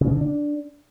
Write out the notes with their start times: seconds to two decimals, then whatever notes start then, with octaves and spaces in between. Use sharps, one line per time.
0.01 C#3
0.11 D3
0.21 D4